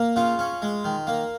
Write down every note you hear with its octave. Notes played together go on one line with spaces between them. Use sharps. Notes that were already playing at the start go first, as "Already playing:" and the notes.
Already playing: A#3
C#3 F4
C#4
G#3
D#3
A#3